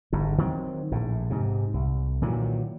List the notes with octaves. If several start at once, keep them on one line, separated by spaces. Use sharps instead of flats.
G1 G#2
D#3 F#3 A3 C4
A#1 A2
G#2 C3
C2
A#2 D#3 E3 F#3